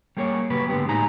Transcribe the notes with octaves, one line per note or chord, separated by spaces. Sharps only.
G3 A#3 G#4 C5 C#5
C#3 F#3 A#3 G4 B4
G#2 D3 G#3 B3 G4
A2 F#3 G#3 D#4 G#5 A#5